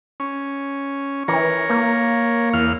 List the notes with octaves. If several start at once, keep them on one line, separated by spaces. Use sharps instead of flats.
C#4
E3 A#4 C#5
A#3
E2 F5 F6